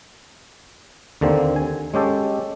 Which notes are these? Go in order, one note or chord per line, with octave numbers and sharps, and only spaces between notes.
D#2 D3 A#3 C4
G#5
G#3 C#4 G4 A4